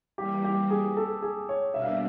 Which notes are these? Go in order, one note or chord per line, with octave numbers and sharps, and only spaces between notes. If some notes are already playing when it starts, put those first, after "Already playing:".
E3 G3 A#3 G4
G4
G#4
A4
G#4
C#5
B2 G3 A#3 D4 E5
F5
E5